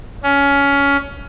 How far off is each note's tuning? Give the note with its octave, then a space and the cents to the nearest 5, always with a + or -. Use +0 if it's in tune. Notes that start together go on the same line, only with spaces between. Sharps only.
C#4 +20